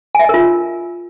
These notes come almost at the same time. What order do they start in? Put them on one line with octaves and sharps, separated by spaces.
G#5 E5 D#5 A#4 F4